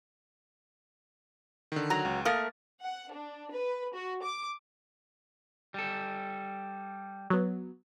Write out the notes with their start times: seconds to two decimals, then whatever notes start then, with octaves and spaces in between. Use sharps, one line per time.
1.72 D3 D#3
1.90 F#3 A#5
2.05 C#2
2.25 A3 A#3 A#4 D#6 A6
2.82 F#5
3.12 D4
3.53 B4
3.95 F#4
4.24 D6
5.74 G3 A4
7.30 F#3 B3